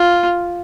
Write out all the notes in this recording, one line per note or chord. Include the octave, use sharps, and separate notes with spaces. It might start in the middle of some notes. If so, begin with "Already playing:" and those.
Already playing: F4